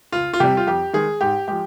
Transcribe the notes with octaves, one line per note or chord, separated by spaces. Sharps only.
C#2 F4
F4
C3 G3 G4
F4
F2 G4
D#3 G#3 G#4
G#2 G4
F3 G#3 G4